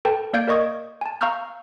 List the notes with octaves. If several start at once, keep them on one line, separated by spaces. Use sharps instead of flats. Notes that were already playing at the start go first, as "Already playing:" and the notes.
A4 B4 G5 A5
A#3 D5 F5 G6 G#6 D7
A#4 D5 D#5 C#6 D#6 G#6
G#5 A5
F5 A#5 C#6 E6 F6 G6